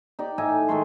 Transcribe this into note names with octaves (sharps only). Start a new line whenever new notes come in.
D#4 G4 D5
A2 D#4 E5 G#5
D#3 G#3 A3 C6